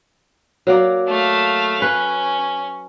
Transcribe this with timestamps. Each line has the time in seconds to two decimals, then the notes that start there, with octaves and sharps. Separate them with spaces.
0.67 F#3 A#3 D5
1.08 A3 F5
1.82 C#4 B4